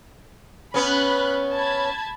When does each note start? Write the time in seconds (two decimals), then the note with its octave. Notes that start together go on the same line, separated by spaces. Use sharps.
0.74 B3 C#4 B5 F#6
1.52 A5 B5 G#6